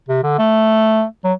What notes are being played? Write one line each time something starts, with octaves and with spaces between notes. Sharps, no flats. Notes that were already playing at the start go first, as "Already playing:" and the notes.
C3
D3
A3
F#3